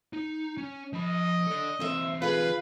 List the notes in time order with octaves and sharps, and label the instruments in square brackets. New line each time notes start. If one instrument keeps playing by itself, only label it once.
[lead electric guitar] D#4
C#4
[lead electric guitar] F3 B5 [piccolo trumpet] D#5
[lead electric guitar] A4 D5
[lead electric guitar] E3 C4 [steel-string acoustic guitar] C5 E5
[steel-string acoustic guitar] F4 G#4 [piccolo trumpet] B4